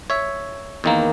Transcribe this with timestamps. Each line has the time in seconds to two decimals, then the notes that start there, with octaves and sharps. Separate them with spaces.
0.10 C#5 E5
0.84 E2 D#3 A#3